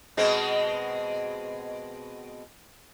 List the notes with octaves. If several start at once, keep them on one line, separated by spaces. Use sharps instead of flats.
B2 G#3 C4